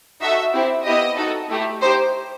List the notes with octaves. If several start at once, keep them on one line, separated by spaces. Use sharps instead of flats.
D#4 F#4 A4 E5
C4 E4 G4
B3 E4 G4 D#5
D#4 F#4 A4
A3 E4 G4
D#4 G4 C5